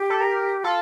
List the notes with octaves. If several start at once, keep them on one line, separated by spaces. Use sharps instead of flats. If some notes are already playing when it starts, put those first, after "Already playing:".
Already playing: G4
A4
A#4
F4 A4